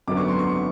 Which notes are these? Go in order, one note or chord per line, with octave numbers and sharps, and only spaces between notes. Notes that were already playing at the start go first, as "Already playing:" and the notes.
G#1 F#2 D3 F#3 B3 D6
C#6
C6
C#6